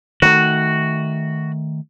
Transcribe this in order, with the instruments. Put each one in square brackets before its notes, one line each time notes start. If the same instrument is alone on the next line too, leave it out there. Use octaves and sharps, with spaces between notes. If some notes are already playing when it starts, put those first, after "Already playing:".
[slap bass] D#3 A3 [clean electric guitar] F#4